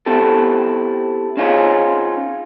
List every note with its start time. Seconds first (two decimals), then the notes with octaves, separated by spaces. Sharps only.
0.06 B3 C4 E4 G4 A4
1.37 C4 C#4 D#4 F4 G#4 C#5